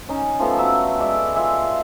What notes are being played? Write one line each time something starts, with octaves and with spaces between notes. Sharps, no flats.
C#4 D#4
F3 A3 B3
F#3 E5
G#3 D5 E5
F4 E5 G#5